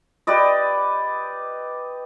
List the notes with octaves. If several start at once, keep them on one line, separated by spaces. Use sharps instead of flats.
G4 B4 D5 D#5